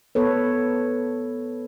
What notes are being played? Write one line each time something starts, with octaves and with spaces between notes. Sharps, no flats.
B3 A4 B4 C#5